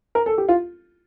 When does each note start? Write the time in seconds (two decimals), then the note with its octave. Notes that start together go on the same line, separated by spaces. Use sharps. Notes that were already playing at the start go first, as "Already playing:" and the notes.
0.15 A#4
0.26 A4
0.38 G4
0.49 F4